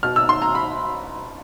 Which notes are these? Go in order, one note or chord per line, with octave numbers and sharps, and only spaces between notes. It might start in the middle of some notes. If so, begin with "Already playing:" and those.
B2 F6
E6
C6
A#5
B5